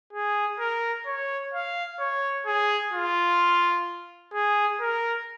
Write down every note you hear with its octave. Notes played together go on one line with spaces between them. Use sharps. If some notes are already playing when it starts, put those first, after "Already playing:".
G#4
A#4
C#5
F5
C#5
G#4
F4
G#4
A#4